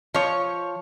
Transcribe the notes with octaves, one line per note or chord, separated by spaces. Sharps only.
F3 C#5